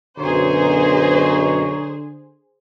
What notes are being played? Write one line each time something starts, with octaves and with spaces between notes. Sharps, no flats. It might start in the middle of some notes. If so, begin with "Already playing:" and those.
B1 F#2 B2 D3 G#4 C5 C#5 A#5